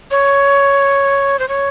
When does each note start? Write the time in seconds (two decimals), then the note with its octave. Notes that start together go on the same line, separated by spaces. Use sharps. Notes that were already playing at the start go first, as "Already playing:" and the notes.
0.11 C#5
1.39 C5
1.48 C#5